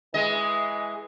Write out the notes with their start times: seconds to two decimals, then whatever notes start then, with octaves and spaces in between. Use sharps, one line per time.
0.14 E3 G#3 D#5